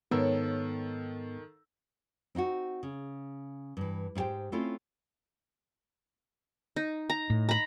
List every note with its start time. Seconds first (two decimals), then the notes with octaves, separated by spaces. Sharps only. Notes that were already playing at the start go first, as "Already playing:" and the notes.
0.11 G#2 D#3 B3 A4 A#4 C#5 F5 E6
2.35 C4 D#4 F4 F#4
2.83 C#3
3.77 G2 E3
4.15 G#2 E4 G4 C5 G5
4.52 A3 C4 C#4 E4 F4 A4
6.76 D#4
7.10 A#5
7.30 A2
7.49 A#5 B5